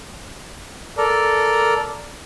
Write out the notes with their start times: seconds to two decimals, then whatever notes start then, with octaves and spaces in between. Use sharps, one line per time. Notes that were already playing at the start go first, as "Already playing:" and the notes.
0.97 A4 A#4 D5